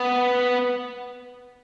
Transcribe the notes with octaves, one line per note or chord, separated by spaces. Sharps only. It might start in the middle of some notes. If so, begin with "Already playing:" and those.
Already playing: B3